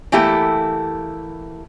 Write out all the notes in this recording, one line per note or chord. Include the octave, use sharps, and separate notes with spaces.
E3 A3 A#3 E4 G4 A4